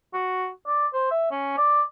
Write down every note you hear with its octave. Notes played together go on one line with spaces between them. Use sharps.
F#4
D5
C5
E5
C#4
D5